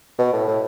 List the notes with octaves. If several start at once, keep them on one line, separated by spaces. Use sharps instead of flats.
B2
A2
A2